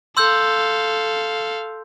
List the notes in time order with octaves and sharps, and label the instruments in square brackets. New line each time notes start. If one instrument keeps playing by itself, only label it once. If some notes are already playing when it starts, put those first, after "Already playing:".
[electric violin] A4 F5 [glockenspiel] C6 E6 G6